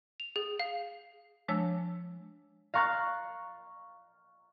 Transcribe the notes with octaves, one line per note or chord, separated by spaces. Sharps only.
F7
G#4
F5
F3 G#3 D4 C#5 A5 E6
F5 A#5 C#6 F#6 A6